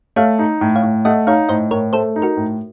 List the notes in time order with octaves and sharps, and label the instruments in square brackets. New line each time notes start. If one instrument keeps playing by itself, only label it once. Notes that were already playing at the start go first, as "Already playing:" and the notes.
[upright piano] A3 [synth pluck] C#5 F5
[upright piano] D#4
A2
[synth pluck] C#5 F5
[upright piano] A2
[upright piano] A3 [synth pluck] D#5 F#5
[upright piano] D#4 [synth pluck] C#5 F5
[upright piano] A2 [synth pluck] C5 D#5
[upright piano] A2 [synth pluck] A#4 C#5
[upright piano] A3 [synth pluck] A4 C5
[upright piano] D#4
[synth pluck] F#4 A#4
[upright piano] A2